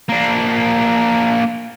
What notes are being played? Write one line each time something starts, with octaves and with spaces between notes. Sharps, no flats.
A#3 D4